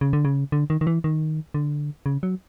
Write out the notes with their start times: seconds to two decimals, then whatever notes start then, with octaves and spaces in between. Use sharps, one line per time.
0.01 C#3
0.13 D3
0.25 C#3
0.52 D3
0.70 D#3
0.81 D#3
0.87 E3
1.04 D#3
1.54 D3
2.06 C#3
2.23 F#3